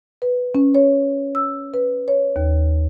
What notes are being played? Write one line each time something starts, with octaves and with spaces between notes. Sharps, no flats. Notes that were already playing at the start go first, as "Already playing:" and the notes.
B4
C#4
C#5
E6
B4
C#5
D#2